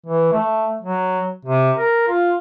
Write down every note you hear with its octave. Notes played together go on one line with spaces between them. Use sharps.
E3
A3
F#3
C3
A#4
F4